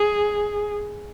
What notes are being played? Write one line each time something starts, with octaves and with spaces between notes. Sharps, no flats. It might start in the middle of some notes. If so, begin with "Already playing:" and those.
Already playing: G#4